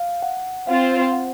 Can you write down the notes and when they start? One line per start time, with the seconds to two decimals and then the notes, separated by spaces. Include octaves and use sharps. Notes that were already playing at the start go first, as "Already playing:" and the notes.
Already playing: F5
0.23 F#5
0.67 C4 F4 C5 F5
1.12 F#5